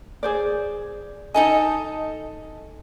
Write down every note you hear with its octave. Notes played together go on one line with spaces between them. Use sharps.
G#4 C5 D5
D#4 A4 D#5 G#5